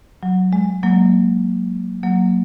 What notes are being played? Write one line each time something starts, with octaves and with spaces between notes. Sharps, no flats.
F#3
G#3
F#3 A#3
F#3 A#3